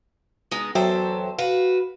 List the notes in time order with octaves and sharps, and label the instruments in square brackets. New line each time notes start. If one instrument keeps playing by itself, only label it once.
[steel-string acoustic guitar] G#3 B3 D#4
[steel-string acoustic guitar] E2 A4 C5 [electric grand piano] F#3 E5 G5
[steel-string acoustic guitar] F#4 B4 [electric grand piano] F5